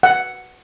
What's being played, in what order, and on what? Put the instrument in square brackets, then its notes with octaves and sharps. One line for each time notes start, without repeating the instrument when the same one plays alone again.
[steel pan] F#5